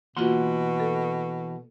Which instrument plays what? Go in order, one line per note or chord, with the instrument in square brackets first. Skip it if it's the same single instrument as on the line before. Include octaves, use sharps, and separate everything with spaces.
[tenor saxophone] B2 [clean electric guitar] E3 F#5 C6 [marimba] A#3 F4 F#4
[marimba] A4